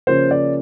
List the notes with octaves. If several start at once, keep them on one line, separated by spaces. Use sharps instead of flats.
C#3 F3 A#3 C#4 C5
D5